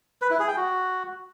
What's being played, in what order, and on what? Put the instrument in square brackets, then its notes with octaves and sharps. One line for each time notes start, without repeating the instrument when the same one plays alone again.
[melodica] B4
E4
G#4
G5
F#4